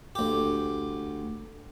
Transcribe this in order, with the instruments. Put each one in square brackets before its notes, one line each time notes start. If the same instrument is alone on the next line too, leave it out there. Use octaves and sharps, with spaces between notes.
[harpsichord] D2 G4